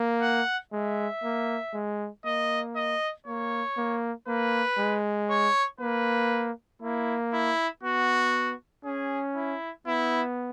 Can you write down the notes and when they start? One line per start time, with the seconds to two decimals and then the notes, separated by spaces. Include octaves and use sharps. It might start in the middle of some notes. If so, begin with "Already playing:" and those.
Already playing: A#3
0.22 F#5
0.72 G#3 E5
1.24 A#3
1.74 G#3
2.25 A#3 D#5
2.76 D#5
3.27 A#3 C#5
3.77 A#3
4.27 A#3 B4
4.78 G#3
5.30 C#5
5.80 A#3 B4
6.82 A#3 E4
7.33 E4
7.83 B3 F#4
8.85 C#4 G#4
9.36 E4
9.87 B3 E4